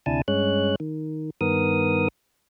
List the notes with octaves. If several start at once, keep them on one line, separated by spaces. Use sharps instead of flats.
D2 C3 D4 E4 G#5 A5
G2 G#3 C#4 C#5 F#6
D#3
G2 D#3 B3 A#4 D#6